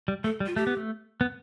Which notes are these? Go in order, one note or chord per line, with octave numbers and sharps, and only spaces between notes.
G3
A3 A4
G3
F4
A3 G4
B3
A3
B3